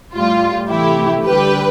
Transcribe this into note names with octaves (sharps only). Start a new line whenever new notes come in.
A2 G3 F4
C3 E3 A3 E4 G4
D3 G3 G4 B4